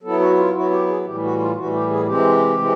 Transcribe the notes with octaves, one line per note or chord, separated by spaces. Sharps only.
F#3 B3 E4 A4
F#4
F4
F#3 B3 E4 F#4
G4
G#4
A2 E3 G3 G4
F#4
F4
A2 E3 G3 F#4
G4
G#4
C3 E3 G#3 C4 G4
C3 E3 G#3 C4